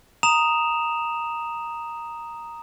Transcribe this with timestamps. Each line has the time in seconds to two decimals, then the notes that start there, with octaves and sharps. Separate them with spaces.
0.23 A#5 D#6 E7 F7